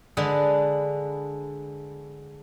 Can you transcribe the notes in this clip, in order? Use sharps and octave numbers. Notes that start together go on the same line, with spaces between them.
D3 G#3 D4 G#4 B4